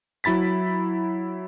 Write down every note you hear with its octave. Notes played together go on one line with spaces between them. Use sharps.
F#3 E4 B5 A6 B6